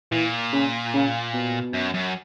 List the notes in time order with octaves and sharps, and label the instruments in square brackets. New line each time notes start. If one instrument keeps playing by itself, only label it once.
[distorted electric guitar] A#2 [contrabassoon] E3
[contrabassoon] C#3
C#3
B2
[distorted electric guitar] F#2
F#2